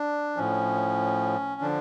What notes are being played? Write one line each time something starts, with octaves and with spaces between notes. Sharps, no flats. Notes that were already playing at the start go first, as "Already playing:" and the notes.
Already playing: D4
A2 F3 C#4
D3 F3 D4